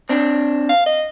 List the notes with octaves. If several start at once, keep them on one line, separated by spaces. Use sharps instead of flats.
C4 D4
F5
D#5